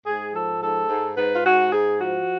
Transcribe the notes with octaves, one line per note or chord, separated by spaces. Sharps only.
G#2 G#4
F3 A4
G#2 A4
G#2
G#2 B4
F4
G#2 F#4
G#2 G#4
F3 F#4